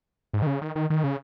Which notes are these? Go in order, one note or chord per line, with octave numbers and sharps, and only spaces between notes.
G#2
D#3
C#3
D#3
D#3
D#3
C#3